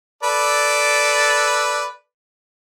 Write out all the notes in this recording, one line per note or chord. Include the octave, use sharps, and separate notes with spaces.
A4 B4 D5